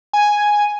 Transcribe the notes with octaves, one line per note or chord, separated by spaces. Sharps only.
G#5